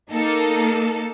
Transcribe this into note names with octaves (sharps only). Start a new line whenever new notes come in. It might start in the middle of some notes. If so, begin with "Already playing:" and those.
A#3 D#4 A4